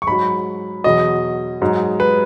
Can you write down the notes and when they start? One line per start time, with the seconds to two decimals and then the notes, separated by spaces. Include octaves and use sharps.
0.02 C#6
0.07 G#2 F#3 B5
0.84 E2 B2 F#3 D#5
1.62 G#2 F#3
2.00 B4